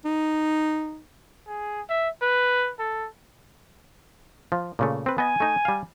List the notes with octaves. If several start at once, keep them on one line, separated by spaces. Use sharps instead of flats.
D#4
G#4
E5
B4
A4
F3
A#2 C#3 A3
C4 B4
B3 D#5 G#5
A3 D#4
G3 F5